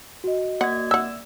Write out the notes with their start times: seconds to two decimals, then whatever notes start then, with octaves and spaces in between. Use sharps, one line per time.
0.24 F#4 D#5
0.61 A#3 D5 F#5 G#6
0.91 E5 F#5 E6